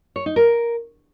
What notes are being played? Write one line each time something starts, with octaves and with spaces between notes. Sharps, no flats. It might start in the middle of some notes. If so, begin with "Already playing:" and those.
C#5
D#4
A#4